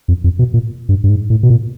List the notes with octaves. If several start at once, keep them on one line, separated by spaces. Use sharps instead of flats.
F2
F2
B2
A#2
G2
G2
G#2
A2
B2
A#2